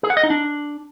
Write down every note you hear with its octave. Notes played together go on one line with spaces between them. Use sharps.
G#4
F#5
D#5
D#4
D4